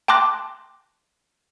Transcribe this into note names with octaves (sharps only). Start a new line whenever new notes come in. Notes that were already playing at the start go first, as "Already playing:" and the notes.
G5 A5 C6 D6 F#6 A#6